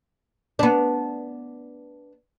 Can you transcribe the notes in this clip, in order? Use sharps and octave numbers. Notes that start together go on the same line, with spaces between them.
B3 D4